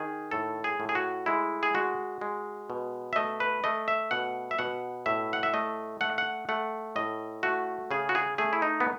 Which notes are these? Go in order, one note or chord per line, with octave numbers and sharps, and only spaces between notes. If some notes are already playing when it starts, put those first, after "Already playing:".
Already playing: D#3 G#4
A2 A4
G#4
A2
G#4
F#4
G#3 E4
G#4
G#3 F#4
G#3
B2
E5
A3 D#5
B4
A3 D#5
E5
B2 F#5
E5
B2 F#5
A2 E5
F#5
E5
A3 D#5
A3 F#5
F#5
A3 F#5
A2 D#5
A3 F#4
C#3 G#4
F#4
G#4
A3 G#4
E4
D#4
B3